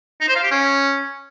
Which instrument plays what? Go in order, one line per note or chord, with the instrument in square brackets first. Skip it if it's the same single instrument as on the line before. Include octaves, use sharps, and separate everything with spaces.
[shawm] D#4
C5
F5
G4
C#4